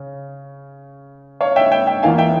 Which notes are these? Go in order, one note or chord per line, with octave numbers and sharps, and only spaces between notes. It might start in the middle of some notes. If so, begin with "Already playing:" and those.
Already playing: C#3
C#5 F5
E5 G5
E5 G5
E5 G5
E2 E3 A#3 F4 F5 G#5
E5 G5